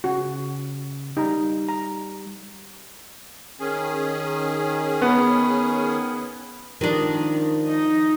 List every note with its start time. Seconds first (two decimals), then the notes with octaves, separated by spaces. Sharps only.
0.04 C#3 F#4
1.17 G3 D#4 A#5
1.69 A#5
3.60 D#3 C#4 G#4
5.02 B3
6.81 D#3 F3 G#3 D4 G4
7.68 D#4 D#5